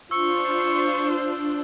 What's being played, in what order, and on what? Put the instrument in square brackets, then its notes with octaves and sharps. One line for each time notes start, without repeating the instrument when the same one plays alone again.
[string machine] D4 [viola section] F4 C5 [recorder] C#6 [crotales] E6